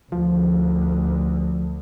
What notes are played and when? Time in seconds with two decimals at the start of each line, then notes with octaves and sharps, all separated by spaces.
0.12 D2 F3